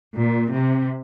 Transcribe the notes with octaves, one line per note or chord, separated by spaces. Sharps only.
A#2
C3